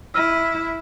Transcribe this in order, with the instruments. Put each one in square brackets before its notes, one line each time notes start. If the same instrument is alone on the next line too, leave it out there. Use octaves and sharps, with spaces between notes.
[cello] E4 [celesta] E6 F6 D#7